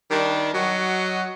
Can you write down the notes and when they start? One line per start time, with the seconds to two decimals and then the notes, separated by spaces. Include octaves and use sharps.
0.10 D#3 G3 D4
0.53 F#3 F#4 D#5